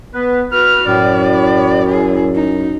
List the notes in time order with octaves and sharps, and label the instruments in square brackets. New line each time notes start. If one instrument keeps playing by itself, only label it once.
[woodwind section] B3 B4
[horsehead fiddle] F#4 B4 [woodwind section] F6
[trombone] F#2 [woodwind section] A2 [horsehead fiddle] D5
[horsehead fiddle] E4 G#4
D#4